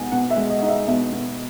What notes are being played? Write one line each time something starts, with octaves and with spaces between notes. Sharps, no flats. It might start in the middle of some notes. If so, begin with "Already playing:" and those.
Already playing: B2 G#3 D#4 F#5 G#5
B2 F#5
E5
G#3
D#5
D#4
E5
B2 E5
B2